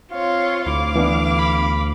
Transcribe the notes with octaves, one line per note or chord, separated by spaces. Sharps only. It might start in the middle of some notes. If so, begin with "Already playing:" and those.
C4 F4 C#5 F5
D2 E4 F5 D6
E3 B3 D4
B5